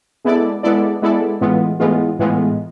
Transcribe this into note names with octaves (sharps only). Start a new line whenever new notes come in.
G#3 B3 E4 A4 D5
G#3 B3 E4 A4 D5
G#3 B3 E4 A4 D5
A2 E3 G#3 B3 F4
A2 E3 G#3 B3 F4
A2 E3 G#3 B3 F4